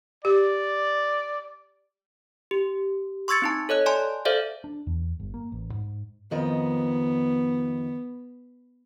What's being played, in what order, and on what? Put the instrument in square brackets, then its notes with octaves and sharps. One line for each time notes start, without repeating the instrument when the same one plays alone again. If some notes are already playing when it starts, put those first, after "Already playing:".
[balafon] G4 [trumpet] D5
[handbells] G4
C6 C#6 E6 G#6 A6 C#7
C4 D#4 A5
A4 C#5 D#5 F#6
D5 G#5 A5 C6
A4 C5 D5 E5 F5
[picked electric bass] D4
E2
G1
A#3
A1
G#2
[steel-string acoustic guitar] F2 D#3 D#5 [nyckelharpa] B3